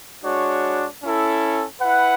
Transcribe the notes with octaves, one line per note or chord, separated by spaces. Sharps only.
G#3 D4 F#4 C#5
C#4 E4 A4
E4 B4 F#5